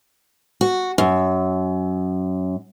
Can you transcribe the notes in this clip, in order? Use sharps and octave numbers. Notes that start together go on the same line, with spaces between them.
F#4
F#2